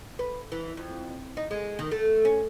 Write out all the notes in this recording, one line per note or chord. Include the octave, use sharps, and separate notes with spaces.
B4
E3
F2
D#4
G#3
D#3
A3
C#4